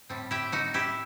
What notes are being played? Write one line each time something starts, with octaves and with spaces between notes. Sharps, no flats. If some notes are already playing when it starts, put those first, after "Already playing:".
A2 G3 C4
E4 G4
D#4 F#4
E4 G4